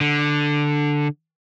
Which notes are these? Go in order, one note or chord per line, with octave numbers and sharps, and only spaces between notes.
D3